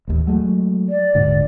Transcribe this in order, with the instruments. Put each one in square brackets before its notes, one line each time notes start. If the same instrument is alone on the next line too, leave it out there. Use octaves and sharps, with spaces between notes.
[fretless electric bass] A1 D#2
F#3 G#3 A3
[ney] D5
[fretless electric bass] D#1 G#2 D3